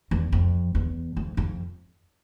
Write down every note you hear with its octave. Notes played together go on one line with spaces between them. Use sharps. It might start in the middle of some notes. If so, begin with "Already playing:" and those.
E2
F2
E2
F2
F2